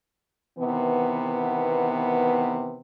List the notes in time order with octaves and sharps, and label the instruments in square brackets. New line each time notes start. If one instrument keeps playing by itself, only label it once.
[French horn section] C3 D#3 E3 B3